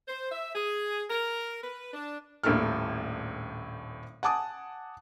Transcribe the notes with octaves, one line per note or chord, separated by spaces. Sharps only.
C5
E5
G#4
A#4
B4
D4
D#1 A#1 A2 A#3 A4 F6
F#5 G#5 A5 D6 D#6